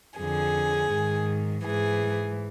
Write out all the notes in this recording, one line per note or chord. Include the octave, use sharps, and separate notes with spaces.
F2 D3 G#4
G#2 D#3
G#2 E3 G#4